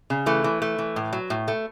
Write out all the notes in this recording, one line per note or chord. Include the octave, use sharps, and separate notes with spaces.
C#3
E3 A3
E3
A3
E3
A2
F#3
A2
A3